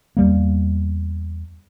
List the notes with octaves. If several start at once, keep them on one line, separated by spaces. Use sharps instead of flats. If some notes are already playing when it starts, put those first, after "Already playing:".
E2 G3 A#3